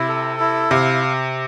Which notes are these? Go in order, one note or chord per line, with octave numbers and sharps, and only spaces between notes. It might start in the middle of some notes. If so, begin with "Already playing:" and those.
Already playing: C3 E4
A4
E4
C3 F5